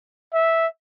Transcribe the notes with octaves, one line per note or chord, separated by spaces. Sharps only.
E5